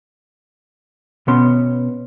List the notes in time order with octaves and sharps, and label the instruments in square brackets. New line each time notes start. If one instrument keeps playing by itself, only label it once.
[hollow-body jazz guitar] B2 B3 C#4 C6